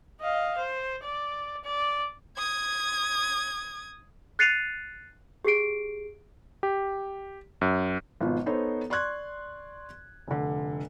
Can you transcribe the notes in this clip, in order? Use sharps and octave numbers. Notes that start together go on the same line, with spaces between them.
D#5 F5
C5
D5
D5
D#6 G#6
F#6 A6 C7 C#7 D#7 F7
G4 G#4 C7 D7
G4
F#2
G#1 B2 F3
B3 D#4 A4 C5 C#5
D5 C6 C#6 F#6 G#6
F1 D3